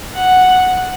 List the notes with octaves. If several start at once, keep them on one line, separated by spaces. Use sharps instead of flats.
F#5